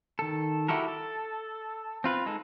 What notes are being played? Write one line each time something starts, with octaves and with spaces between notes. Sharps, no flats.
D#3 A4
E4 F#4 G4 A4 A#4
A4
C4 F4 B4
G#3 D#4 A4